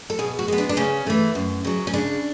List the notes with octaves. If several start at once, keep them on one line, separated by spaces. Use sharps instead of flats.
A4
B2 G#4
F#4
G#3 B3
D4
D4
C#3 C#4
E3 A3
F#2
C#3 F#3
C#4
C#3 D4